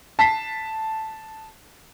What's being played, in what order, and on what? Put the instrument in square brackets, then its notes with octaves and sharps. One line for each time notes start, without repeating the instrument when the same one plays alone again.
[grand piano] A5 B6 C7